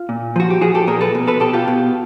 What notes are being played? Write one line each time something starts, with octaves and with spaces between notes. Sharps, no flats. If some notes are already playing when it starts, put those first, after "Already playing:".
Already playing: F4
A#2
F3 F#4
G4
F3 F#4 G#4
G4 A4
A#2 G#4 A#4
A4 B4
B2
A4 B4
B2 G4 A4
F4 G4
B2